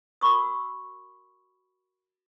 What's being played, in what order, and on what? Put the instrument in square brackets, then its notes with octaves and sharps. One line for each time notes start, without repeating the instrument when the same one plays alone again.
[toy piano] F#4 A#4 B5 C#6 D#6